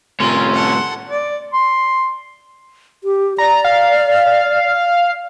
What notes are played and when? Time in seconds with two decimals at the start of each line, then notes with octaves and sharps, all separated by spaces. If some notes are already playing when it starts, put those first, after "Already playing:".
0.20 A2 C3 C#4 F4 A#4 C6
0.54 A4 F#5
1.09 D5
1.53 C6
3.04 G4
3.38 D5 A#5
3.64 F5